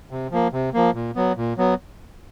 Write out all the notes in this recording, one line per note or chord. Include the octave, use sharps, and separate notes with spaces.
C3
F3 A#3
C3
F3 A#3
A#2
F#3 B3
A#2
F#3 B3